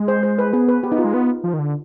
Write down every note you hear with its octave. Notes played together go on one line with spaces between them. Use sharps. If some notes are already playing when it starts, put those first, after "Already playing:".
Already playing: G#3
C5
C5
B4
B3 G#4
B4
B3 G4
D#4
F4
G#3
B3
F3
D#3
D3